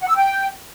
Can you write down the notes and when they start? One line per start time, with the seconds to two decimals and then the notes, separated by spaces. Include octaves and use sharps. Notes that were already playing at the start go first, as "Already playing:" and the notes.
0.01 F#5
0.09 E6
0.16 G5